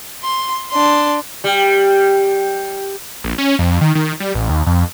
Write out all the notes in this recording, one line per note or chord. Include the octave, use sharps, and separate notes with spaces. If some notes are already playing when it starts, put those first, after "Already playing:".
C6
D4 C6
G3
A#1
C#4
F2
D#3
D#3
G3
A1
D#2
F2